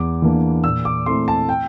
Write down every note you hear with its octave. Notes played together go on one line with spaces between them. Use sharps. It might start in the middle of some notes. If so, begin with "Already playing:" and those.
Already playing: E2 D6
E3 A#3 D4
A#2 E6
D6
A3 C4 E4 C6
A5
G5